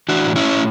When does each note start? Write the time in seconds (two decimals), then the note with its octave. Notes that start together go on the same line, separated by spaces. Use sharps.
0.09 E3 D4 F#4
0.26 A2
0.36 C#4 E4
0.45 A2